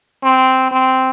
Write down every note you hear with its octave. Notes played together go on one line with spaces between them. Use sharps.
C4
C4